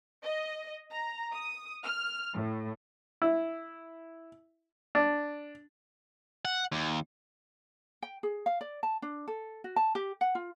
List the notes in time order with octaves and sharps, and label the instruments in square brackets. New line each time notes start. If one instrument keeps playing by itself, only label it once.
[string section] D#5
A#5
D#6
F6
A2
[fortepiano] E4
D4
[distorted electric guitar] F#5
D#2
[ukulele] G5
G#4
F5
D5
A5
D4
A4
F#4
A5
G4
F#5
F4